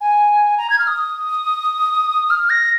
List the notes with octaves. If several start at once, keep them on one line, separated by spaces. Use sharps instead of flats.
G#5
A#5
G#6
F6
D#6
F6
A#6